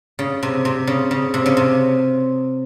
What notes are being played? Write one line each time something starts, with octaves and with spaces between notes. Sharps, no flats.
C#3
C3
C3
C#3
C#3
C3
C#3
C3